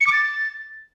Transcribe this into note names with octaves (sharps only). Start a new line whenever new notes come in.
C#7
D6
A6